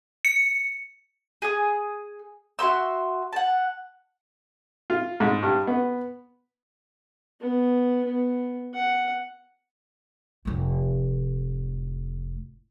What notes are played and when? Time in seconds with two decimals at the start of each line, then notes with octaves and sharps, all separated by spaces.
0.25 C#7
1.42 G#4 D#6
2.59 F#4 E5 C6 E6
3.33 F#5 A5
4.90 F4
5.20 G#2
5.43 G2
5.67 B3
7.41 B3
8.04 B3
8.74 F#5
10.45 F1 A2